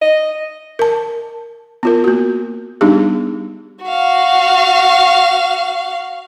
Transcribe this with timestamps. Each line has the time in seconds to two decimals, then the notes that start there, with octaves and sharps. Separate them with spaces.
0.02 D#5
0.79 A#4 A5
1.83 B3 F4 A#4
2.04 A#3 F#4
2.81 G3 B3 D4 D#4 G4 G#4
3.84 F#4 F5